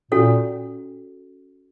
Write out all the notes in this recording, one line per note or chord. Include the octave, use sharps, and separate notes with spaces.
A#2 C#4 F#4 A4 C#5